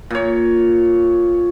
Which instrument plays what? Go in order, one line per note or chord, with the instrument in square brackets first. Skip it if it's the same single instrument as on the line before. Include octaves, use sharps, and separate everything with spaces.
[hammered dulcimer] A#2 C#5